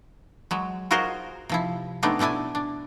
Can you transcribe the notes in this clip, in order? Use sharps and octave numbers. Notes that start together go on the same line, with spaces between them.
F#3 G#3
F4 F#4 G#4 A#4 C5 D#5
C3 F3 E4
G#3 A3 B3 C4 D4 D#4
B2 A3 D4 E4 G#5
D4